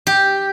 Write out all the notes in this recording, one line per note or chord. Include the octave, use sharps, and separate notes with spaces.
G4